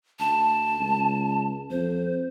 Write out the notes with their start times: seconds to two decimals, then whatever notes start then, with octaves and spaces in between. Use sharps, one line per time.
0.19 D2 A5
0.80 C#2
1.71 F2 C5